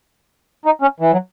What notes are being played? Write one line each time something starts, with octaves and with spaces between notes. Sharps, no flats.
D#4
C#4
E3
F#3